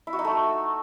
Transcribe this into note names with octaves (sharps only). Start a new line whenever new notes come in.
E4
F#4
D#4
A3